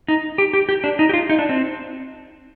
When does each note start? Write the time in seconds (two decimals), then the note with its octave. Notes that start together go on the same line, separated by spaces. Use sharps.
0.08 D#4
0.38 G4
0.53 G4
0.69 G4
0.84 D4
0.99 D#4
1.09 G4
1.14 F4
1.29 D#4
1.39 D4
1.49 C4